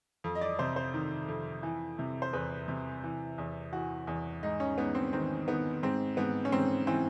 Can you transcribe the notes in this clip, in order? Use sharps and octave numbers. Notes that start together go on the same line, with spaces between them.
F2
D#5
D5
C3 C5
C5
D#3
F2
E3
C3
C5
E2 B4
C3
E3
E2
E3 F#4
E2
G#2 D#4
C#4
G#2 B3
C4
D#3 C4
D#3 B3
G#2 C4
G#2 B3
C#4
G#2 C4
E3 C4